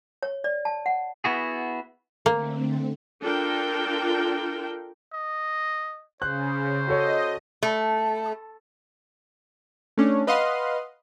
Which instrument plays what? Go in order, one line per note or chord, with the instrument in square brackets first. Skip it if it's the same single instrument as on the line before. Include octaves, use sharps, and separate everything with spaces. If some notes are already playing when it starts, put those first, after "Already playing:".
[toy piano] C#5
D5
A5
F#5
[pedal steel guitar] B3 E4 F#4 G#4
[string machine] D3 A3 C4 [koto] A#3
[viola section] D4 F4 A4 A#4 G5
[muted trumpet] D#5
[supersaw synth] C#3 [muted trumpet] C5 [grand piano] F#6
[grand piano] F#4 A4 C#5 [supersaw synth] D#5
[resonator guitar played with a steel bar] A3
[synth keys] A3 C#4 D4
B4 D#5 F5 F#5 C6